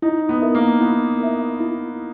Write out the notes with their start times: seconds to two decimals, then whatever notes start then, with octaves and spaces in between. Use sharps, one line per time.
0.02 D#4 E4
0.29 B3
0.42 A#4 E5
0.55 A#3
0.81 B3 E4
1.20 A#4 E5
1.60 E4